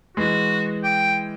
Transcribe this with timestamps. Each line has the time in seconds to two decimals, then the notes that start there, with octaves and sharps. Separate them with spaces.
0.17 E3 G#3 F#4
0.84 G5